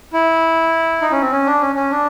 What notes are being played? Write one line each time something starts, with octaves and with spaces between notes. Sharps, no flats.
E4
D#4
C#4
C4
C#4
D4
C#4
C#4
D4